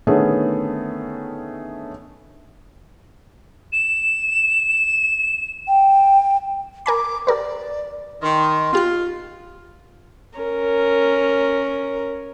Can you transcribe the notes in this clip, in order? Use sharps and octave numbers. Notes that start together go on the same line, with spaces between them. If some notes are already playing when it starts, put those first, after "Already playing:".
D3 D#3 A3 B3 C#4 G#4
E7
G5
A#4 G#5 B5 D6
G4 A#4 B4 D5
D#3 C6
B3 F4 G4 F#6
C#4 A#4